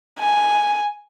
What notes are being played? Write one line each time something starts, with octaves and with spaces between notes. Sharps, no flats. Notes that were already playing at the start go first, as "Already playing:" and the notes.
G#5